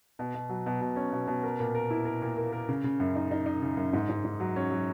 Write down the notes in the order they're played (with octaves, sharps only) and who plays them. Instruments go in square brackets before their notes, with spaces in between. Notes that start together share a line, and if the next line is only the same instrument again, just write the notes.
[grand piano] B2
B2
F#3
B2
B2
C#4
B2
B2
A#4
A#2
A#4
E4
A#4
A#2
A#3
A#4
C#3
C#3
F#2
D#4
D#4
D#4
C#3
F#2
G#2
G#2
G#2
F#3
C#4
F#3